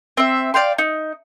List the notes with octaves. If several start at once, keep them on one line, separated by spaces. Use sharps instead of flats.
C4 E5
D5 F5 G5 C6
D#4